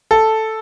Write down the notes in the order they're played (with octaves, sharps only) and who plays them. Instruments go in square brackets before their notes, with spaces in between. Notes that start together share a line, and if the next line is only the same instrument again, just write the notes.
[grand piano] A4